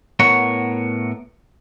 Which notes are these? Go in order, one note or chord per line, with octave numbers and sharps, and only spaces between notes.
A2 B3 A#4 C#5 F#5